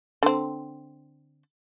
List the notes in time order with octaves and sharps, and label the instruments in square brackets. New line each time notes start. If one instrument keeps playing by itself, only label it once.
[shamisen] D3 C4